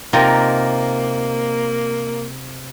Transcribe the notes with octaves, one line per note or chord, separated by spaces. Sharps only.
C3 A#3 D#4 F4 A#4